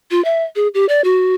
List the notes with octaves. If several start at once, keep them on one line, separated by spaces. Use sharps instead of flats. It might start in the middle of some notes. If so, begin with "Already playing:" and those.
F4
E5
G#4
G4
D5
F#4